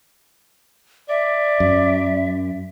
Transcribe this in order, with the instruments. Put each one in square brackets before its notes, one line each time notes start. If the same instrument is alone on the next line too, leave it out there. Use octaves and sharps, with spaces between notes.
[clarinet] D5 [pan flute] E5
[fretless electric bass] F#2